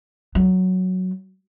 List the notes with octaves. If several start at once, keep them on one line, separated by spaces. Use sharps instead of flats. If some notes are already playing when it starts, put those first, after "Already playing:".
F#3